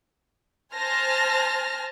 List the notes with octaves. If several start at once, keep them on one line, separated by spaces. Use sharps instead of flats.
C5 G#5 A5 F6 A#6